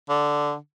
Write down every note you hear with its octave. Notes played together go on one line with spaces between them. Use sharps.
D3